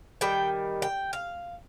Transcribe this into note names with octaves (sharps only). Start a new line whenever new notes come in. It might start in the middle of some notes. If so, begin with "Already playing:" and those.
D#3 G3 G5
G5
F5